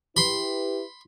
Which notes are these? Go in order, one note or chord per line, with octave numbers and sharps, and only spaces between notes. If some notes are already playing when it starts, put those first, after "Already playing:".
E4 G4 B4 B5 C6